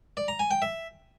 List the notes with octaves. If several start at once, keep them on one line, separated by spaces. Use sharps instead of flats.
D5
A#5
G#5
G5
E5